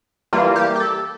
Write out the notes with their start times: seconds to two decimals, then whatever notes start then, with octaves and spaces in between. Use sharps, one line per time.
0.33 E3 G3 A#3 F4
0.56 G4
0.76 G4
0.80 A4